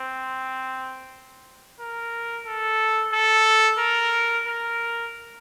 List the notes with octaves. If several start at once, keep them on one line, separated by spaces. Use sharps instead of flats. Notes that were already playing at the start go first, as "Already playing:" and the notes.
Already playing: C4
A#4
A4
A4
A#4
A#4